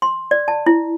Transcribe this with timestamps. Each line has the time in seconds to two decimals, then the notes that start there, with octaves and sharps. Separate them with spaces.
0.02 C6
0.31 D5
0.48 A5
0.66 E4